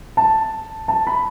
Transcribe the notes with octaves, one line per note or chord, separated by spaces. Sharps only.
A5
A5
B5